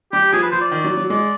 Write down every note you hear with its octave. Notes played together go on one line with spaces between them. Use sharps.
G3 G4
F3 G#4
B4
F3 C5
D5
D#3
F#3
F#3
G#3 D5